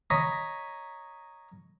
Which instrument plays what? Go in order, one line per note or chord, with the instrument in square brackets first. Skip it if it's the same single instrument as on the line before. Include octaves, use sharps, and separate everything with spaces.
[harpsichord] C#5 D#5 A#5 B5